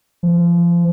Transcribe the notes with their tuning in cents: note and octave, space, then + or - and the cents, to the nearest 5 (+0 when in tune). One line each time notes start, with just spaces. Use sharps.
F3 -25